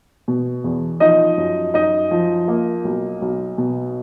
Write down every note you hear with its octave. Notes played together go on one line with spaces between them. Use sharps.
B2
E2
F3 D#4 D#5
F#2
F#2 D#4 D#5
F3
A#3
B1
B1
B2